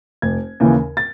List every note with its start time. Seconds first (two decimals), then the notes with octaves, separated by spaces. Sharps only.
0.22 F1 G#6
0.60 D#2 C#3 E3
0.97 A6